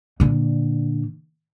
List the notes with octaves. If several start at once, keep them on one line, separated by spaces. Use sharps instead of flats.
A#2 D3